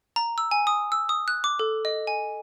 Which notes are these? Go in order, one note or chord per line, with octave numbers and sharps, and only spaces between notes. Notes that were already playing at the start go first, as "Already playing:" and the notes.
A#5
E6
G#5
D#6
E6
D#6
F#6
D6
A4
D#5
G#5